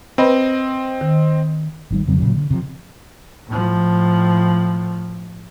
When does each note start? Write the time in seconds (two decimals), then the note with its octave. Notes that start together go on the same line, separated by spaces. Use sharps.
0.18 C4 B4 D#5 B5
1.01 D#3
1.91 G#1 D#3 G3
2.07 F2 C#3 F#3 C4
2.18 A#2 C#3 F#3
2.33 D3
2.51 C3 F3
3.47 A2 F3